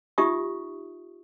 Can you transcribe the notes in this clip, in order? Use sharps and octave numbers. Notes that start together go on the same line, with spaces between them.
D#4 F4 G4 E5 C#6 D#6